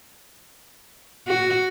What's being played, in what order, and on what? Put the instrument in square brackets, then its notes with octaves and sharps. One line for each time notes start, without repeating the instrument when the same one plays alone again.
[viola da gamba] F#4